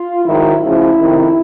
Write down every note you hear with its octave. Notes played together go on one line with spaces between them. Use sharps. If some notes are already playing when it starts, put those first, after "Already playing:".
Already playing: F4
G#2 D#3 F#3 E4
D2 C#3 F3 E4
F2 C3 D#3